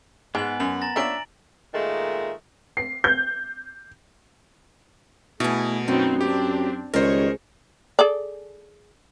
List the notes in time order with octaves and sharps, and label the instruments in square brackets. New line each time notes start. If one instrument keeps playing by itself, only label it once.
[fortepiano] G#2 [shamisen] G#3 [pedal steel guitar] B3 [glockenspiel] G#5 F#7
[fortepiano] F#2 [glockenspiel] F#7
[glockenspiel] A#5 A6 A#6
[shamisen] F3 A#3 C#4 [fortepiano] D4 E5 [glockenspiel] A#5 D7 F#7
[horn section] A#2 D#3 G#3 A3
[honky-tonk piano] C7
G6
[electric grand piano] B2 [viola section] A3 [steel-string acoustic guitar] E4 G#4
[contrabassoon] F#2 [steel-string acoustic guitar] F#3 [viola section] B3 C4 D#4
[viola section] C4 D4 [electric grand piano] G4
[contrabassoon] C#2 [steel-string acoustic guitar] D#3 G3 [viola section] G#4 C#5 [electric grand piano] A#4 C5
[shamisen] G#4 A4 D5